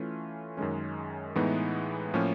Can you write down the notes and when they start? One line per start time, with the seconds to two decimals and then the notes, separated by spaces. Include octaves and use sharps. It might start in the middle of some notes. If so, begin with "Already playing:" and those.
Already playing: E3 A3 C#4 F4
0.57 F#2 D#3 G#3 C#4
1.36 A2 E3 G#3 B3 D#4
2.14 A2 F3 A#3 C#4